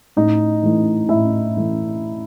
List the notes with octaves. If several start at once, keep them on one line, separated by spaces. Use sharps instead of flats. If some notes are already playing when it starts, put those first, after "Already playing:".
A2 D#4 D#5
E3 A3
A2 E4 E5
E3 A3